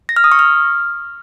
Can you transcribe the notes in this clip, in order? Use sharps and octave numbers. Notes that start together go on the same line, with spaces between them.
A#6
F6
D#6
C#6
F6